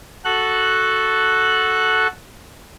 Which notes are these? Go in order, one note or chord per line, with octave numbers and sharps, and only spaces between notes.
F#4 A4 F#6